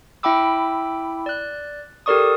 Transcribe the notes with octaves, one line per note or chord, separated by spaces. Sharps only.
E4 E5 G5 B5 D6 E6
D5 F#6
G4 A4 A#4 D5 C#6 D#6